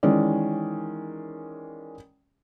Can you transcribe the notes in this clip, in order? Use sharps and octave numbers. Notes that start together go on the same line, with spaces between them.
D#3 E3 G#3 C#4 D5